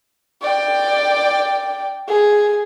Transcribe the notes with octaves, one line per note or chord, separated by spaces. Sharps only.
D5 G5
G#4